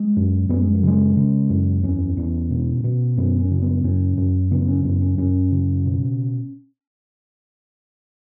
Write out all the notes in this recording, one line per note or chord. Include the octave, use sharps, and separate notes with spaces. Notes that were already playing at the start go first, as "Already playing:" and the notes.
Already playing: G#3
F#2
F#2 B3
G#3
F#3
C#3 G#3
C#3
F#2
E2 C#4
E2
B2
B2
F#2 B3
C#4
C#3
B3
F#2 C#4
F#2
C#3 B3
C#4
F#2 B3
C#4
F#2 C#4
C#3
B2